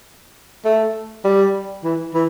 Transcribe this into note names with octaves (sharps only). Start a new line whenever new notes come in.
A3
G3
E3
E3